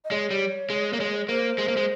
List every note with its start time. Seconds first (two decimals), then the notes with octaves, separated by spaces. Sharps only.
0.05 D#5
0.11 G#3 C#5
0.31 G3
0.70 G#3
0.93 A#3
1.00 G#3
1.29 A#3 C5
1.58 G#3
1.68 A#3
1.77 G#3